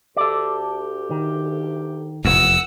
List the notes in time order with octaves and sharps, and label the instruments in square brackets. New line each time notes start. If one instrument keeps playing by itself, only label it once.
[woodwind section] D2 G4 [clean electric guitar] A4 D5
[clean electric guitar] D#3
[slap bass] F1 E2 [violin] F#5 E6